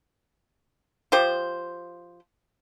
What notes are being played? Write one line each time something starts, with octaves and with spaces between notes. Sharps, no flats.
F3 F4 G4 C5